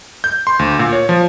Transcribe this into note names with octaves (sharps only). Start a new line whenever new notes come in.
G6
C6
D2
A#2
C#5
F3